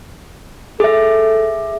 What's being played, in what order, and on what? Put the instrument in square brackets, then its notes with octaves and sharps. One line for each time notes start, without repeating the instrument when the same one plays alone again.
[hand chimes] G#4 E5 [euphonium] A4